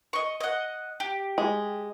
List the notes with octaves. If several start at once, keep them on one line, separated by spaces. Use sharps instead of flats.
D#5 C#6
D#5 F#5
G4
G#3